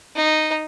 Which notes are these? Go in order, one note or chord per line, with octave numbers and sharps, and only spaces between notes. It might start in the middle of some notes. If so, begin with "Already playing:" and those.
D#4